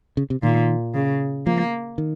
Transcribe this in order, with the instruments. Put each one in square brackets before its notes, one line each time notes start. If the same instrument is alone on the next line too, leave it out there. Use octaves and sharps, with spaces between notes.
[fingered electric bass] C#3
C3
[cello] A#2 [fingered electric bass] D#3
[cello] C#3
[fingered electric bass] F3 [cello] A#3
[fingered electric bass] D#3